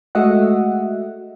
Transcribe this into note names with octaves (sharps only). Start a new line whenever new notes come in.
G#3 A3 F#4 D#5 E5 F#5